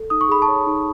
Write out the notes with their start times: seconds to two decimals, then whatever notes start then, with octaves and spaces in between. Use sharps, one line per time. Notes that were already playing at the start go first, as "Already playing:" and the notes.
Already playing: A4
0.10 D#4 D#6
0.21 C#6
0.29 G#4 B5
0.42 A5 C#6
0.48 C#5
0.67 D#4